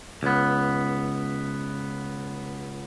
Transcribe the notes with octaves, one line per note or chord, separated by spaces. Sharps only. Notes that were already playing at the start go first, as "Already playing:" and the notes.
C#2 B3